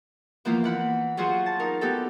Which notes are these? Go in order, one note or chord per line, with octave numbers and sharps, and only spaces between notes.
E3 F3 A#3 B3 E4 F4
E3 F#5 B5
F#3 F4 F#4 G#4 C5
A5
D#4 A#4
B3 D#4 G4 A4